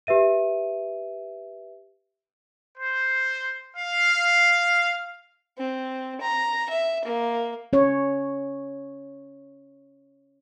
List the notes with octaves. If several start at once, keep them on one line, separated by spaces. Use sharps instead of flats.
G4 B4 E5 D#7
C5
F5
C4
A#5
E5
A#3
C#4 C#5